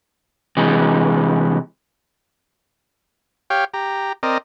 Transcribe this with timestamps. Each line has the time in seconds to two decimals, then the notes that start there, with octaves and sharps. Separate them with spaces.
0.57 C3 E3 G#3
3.50 G4 C#5 F5 G5
3.74 G4 A#5
4.23 C4 A#4 D5 D#5